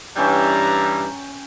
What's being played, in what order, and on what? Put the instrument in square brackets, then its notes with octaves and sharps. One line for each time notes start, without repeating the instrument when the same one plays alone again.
[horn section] G2 E3 G3 [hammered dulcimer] C#4 G5 [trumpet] A#5